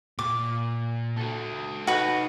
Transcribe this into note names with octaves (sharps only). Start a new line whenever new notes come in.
A#2 D6
F#4 A4
D#4 F#4 A4 B4